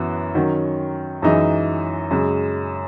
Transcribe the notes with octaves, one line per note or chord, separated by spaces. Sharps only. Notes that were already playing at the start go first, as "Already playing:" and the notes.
Already playing: F#2 E3 B3
D#3 F#3 C#4
F#2 E3 G#3 D#4
F#2 C#3 G#3